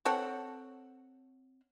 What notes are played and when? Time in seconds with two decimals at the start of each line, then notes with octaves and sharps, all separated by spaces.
0.05 C4 A4 C#5 F#5